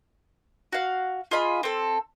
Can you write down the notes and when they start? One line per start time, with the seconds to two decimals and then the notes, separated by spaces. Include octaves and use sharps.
0.73 F#4 F5
1.31 F4 G#4 D#5 B5
1.63 C4 A4